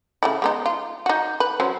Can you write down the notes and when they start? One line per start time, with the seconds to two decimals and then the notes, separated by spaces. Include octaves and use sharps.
0.23 C#3 A3 E4
0.42 G#3 B3 D#4
0.66 F4
1.06 D#4 F#4
1.40 B4
1.60 F#3 C#4 C5